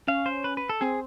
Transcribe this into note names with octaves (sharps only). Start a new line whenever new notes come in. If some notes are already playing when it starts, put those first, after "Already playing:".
C#4 F5
C5
B4
B4
A4
C4 G#4